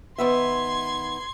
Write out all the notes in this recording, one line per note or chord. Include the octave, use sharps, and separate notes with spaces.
D#3 B3 E5 C6 G#6